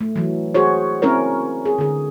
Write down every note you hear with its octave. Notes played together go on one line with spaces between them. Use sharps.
A3
E3 F#3
F#4 G#4 C5 C#5
C4 C#4 E4 A#4 C#5
G#4
D3 G#4